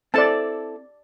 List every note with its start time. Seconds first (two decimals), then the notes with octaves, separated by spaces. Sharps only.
0.14 C4 E4 A4 D5 A5